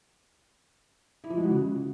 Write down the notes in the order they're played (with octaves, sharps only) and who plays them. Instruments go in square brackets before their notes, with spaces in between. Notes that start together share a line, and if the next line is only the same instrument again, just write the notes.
[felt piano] E4
F3
G#3
F#4
C#3